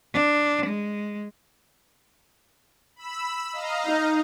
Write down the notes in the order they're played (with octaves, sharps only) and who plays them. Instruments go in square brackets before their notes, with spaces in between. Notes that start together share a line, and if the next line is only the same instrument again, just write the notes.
[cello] D4
G#3
[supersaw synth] B5 E6
D#5 F5 A#5
[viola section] D#4